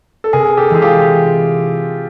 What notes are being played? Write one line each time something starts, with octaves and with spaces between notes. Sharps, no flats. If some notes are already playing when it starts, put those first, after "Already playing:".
A4
C3 G#4 A#4
G4 A4
E3 G#3 C4 E4 G#4
F4 G4